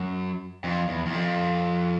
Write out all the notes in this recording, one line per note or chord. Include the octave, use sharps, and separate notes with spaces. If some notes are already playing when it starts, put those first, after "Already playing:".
Already playing: F#2
F2
E2
E2
F2